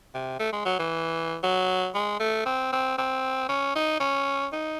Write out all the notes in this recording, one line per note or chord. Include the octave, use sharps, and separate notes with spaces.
C3
A3
G#3
F#3
E3
F#3
G#3
A3
C4
C4
C4
C#4
D#4
C#4
D#4